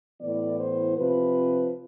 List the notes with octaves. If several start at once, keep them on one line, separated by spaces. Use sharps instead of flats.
A2 E3 B3 D5
C5
C3 F3 C4 B4